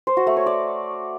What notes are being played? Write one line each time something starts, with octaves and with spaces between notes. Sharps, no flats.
C5
F#4
A3
C#5
D5